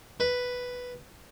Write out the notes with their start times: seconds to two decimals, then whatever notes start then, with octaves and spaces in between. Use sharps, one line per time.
0.20 B4